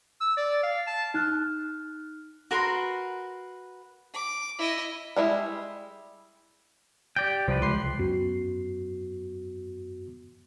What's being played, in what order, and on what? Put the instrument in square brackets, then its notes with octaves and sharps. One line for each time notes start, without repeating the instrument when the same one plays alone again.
[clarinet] E6
D5
F5
A5
[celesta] D#4 F6 F#6
[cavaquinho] F#4 A#4 B4 C6
[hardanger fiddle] D6
E4 D#5
[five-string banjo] G3 G#3 E4
[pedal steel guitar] G4 D5 G5 [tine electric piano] G6
[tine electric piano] C2 [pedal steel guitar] F3 G4 B4
[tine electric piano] C#2 C6 C7
F#2 B3 F#4 C7